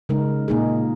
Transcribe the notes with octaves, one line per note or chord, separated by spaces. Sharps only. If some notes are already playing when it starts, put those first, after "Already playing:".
C#3 G#3 D#4 A#4
A#2 A#3 D#4 G#4